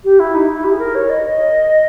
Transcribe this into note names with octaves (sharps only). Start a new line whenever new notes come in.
G4
E4
D#4
E4
G4
G#4
A#4
C#5
D#5
D#5